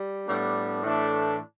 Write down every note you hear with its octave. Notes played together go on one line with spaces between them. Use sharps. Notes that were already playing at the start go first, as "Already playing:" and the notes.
Already playing: G3
A2 G3 B3 D4
A2 E3 A3 D4